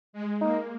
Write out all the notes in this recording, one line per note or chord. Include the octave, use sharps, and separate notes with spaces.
G#3
A#3 D#4